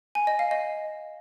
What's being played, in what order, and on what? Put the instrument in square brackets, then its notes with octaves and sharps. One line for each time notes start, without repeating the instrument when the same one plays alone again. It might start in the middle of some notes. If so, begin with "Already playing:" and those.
[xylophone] G#5
D#5
F5
D#5